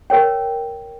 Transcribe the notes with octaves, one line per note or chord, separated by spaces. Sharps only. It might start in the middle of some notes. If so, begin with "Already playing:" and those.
A#4 C#5 G5